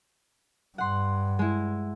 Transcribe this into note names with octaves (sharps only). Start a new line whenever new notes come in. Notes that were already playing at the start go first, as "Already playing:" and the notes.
G2 F#5 C6
G#3 E4